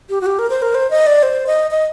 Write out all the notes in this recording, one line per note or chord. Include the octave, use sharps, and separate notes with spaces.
G4
F#4
G4
A#4
C5
A#4
C5
D#5
D5
C5
D#5
D#5